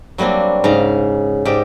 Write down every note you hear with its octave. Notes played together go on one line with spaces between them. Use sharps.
F#3 G3 A#3 C4 D4
G#2 C#3 F5 A#5
G#2 D#4 G4 D5 G5